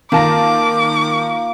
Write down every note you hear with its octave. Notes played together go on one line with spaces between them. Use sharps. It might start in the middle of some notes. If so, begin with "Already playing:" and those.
D#3 A#3 F4 A5 D6 A#6